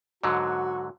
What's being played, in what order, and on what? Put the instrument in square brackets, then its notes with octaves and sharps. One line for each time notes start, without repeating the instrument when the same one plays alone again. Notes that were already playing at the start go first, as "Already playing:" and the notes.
[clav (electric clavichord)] G#2 D3 F#3 [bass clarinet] F#4